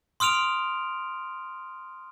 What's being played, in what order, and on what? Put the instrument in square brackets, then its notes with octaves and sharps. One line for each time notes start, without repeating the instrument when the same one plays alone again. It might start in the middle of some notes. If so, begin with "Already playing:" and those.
[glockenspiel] C6 D#6 F6 D7 F7